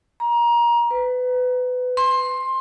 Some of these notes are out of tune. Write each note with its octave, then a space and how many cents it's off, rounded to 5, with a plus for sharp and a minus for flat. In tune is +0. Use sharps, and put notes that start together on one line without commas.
A#5 +25
B4 +25
C6 +20